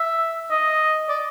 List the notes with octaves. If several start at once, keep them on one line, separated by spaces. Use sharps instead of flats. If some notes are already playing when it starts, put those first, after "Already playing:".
Already playing: E5
D#5
D5